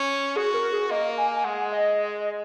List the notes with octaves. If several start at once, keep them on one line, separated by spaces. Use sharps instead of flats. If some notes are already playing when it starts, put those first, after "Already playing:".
Already playing: C#4
F#4 G#4
A#4
G#4
A#3 D#5
G#5
G#5
G#3 F#5
D#5